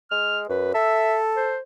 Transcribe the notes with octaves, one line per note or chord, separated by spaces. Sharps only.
G#3 F6
F#2 B4
A4 E5
C5